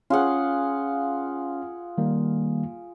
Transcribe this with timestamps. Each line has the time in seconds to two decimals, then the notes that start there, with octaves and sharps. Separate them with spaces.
0.10 C#4 F4 G#4 F#5
1.98 D#3 G3 A#3